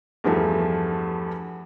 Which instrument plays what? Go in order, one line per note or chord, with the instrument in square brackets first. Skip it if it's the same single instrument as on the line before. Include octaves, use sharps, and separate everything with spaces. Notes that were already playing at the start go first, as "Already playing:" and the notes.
[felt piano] E2 G2 F3 A3